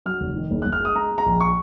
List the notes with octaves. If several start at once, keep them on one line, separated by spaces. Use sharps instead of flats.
F#3 F6
F1
D#3
F#1
F#1 F#6
F6
G#3 D#6
G#3 A#5
G#3
A#5
A#1
C#6